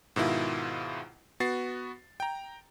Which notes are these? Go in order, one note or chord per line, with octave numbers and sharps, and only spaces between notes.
G#2 B2 D#3 E4 F4
B3 F#4 A6 C7
G5 A#5